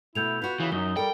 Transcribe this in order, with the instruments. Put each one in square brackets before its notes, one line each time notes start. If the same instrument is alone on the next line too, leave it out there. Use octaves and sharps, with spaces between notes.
[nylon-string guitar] B2 A3 B3 [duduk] E4 [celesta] G6 G#6 F7
[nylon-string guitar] F4 F#4 [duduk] B4
[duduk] C#3 [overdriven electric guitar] E3
[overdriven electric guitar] F#2 [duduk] D#4 [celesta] G7
[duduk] G3 [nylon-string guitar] A4 A#4 [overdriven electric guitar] G5